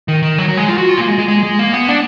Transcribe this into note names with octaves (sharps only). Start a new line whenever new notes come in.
D#3
D#3
F#3
F#3
G#3
F4
F#4
F4
A#3
G#3
G#3
G#3
G#3
A#3
B3
D4